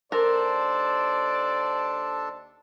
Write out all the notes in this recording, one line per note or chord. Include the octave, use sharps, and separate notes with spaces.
D#2 D4 A4 A#4 C5 D5 A5